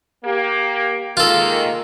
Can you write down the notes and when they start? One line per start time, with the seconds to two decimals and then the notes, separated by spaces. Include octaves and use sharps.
0.24 A#3 G4
1.17 D#3 G#3 A#3 F4 A4